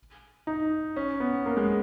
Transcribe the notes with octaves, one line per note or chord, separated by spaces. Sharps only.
D#4
C#4
B3
A#3
G#3